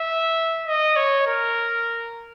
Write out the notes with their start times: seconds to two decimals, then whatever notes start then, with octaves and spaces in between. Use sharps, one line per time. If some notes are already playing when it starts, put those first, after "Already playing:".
Already playing: E5
0.67 D#5
0.96 C#5
1.26 A#4